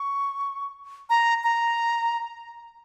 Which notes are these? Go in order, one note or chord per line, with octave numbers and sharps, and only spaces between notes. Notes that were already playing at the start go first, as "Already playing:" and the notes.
Already playing: C#6
A#5
A#5